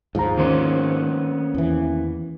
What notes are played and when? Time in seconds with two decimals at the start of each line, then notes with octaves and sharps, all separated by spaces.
0.15 D#2 G#2 F3 A#5
0.38 D#3 A#3 B3 C#4 C5
1.55 E2 E3